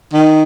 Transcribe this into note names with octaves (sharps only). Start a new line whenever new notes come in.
D#3